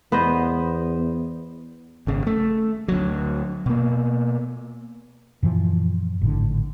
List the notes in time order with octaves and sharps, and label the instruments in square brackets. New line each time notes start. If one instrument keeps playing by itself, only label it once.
[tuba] E2 [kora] B3 C5 D#5
[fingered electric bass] G#1 C#3
A3
D2 F#3
B2 A#3
[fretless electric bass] F#2 A#2 E3 F3
G#1 A2 D3